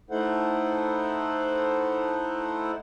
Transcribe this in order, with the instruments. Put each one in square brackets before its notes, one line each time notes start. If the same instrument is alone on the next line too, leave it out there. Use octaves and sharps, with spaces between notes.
[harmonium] A3 D#4 E4 A4 C5 F#5